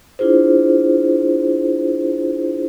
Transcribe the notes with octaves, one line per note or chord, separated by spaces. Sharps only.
D4 E4 F4 G#4 C5